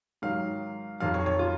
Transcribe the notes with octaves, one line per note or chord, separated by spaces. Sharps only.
G#2 D#3 F#3 F5
F2 D#3 F#3 F5
C#5
C#5
F4